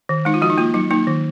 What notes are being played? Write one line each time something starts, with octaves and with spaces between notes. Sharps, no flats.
D#3
G#3 D#4
F4
F3 F#4
D#4
A#3 F4
F#3 D#4
A#3 D#4
D#3